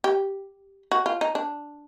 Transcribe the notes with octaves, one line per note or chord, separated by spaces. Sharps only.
G4
F#4
F4
D#4
D4